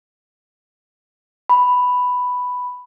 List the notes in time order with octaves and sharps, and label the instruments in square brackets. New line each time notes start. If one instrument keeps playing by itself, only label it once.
[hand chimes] B5